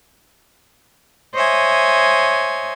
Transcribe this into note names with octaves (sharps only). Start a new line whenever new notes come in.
C5 C#5 D#5 E5 G#5